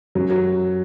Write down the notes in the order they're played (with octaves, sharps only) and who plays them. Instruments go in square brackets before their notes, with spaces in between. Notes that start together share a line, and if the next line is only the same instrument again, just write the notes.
[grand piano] F#2 [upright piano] F#3
[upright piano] F#3